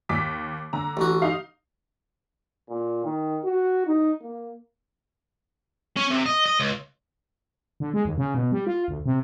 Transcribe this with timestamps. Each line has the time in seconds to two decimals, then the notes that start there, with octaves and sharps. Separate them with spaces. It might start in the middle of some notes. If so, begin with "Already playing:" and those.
0.09 D#2 D6 B6
0.73 D3 A#5
0.97 A1 F#4
1.22 D#4 F5
2.69 A#2
3.05 D#3
3.45 F#4
3.87 D#4
4.22 A#3
5.97 C#4
6.10 C3
6.26 D#5
6.46 D#5
6.60 C#2
7.80 D3
7.94 G#3
8.05 D#2
8.18 C#3
8.35 B2
8.52 G3
8.67 F4
8.88 D2
9.06 C3